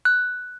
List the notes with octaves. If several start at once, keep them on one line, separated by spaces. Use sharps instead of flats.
F#6